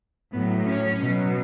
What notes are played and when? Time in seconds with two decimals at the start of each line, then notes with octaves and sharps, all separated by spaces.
0.33 A2 F#3 B3
0.65 C#4
0.99 B2 F#3